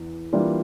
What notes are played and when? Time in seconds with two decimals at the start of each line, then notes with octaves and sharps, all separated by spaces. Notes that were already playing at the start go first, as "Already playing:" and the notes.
Already playing: E2 E3
0.33 E3 G3 A#3 D4 F4